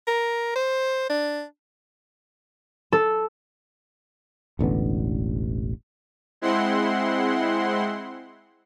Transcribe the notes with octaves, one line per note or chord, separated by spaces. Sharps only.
A#4
C5
D4
A4
E1 A1 D3 B3
G#3 C4 E4 F#5 C6